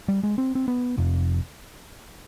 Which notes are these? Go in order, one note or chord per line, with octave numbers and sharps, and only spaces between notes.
G3
G#3
C4
C4
B3
F1 F2 C3